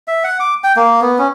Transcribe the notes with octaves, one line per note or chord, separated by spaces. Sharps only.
E5
F#5
D6
G5
A#3
B3
C#4